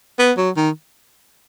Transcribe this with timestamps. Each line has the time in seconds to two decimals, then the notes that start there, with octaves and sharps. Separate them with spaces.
0.19 B3
0.37 F#3
0.57 D#3